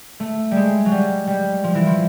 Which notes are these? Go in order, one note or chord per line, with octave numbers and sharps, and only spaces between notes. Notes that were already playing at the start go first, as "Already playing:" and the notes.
A3
G3 G#3
F#3
G3
G3
F3
E3
F3